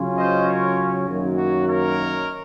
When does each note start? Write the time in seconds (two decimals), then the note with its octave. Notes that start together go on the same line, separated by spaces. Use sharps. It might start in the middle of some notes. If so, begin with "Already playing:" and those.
Already playing: C#3 F#3 C#4 F4
0.16 C5 D#5
0.47 A#4 C#5
1.07 F#2 D#3 F#3 A#3
1.37 F#4
1.68 A#4 C#5